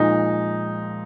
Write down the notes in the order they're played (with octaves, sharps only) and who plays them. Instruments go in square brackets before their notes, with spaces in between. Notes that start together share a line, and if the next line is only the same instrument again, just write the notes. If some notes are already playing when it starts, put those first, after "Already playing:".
Already playing: [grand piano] A#2 F3 G#3 D#4